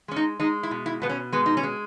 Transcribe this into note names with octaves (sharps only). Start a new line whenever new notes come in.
G#3 C#4
D#4
G#3 D#4
E4
B2
E4
B2 B3
C#4
G#3 B3
D#4
C#4
G#3